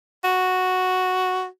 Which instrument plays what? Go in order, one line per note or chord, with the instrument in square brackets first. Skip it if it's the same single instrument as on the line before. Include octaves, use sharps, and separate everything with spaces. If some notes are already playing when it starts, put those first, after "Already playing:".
[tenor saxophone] F#4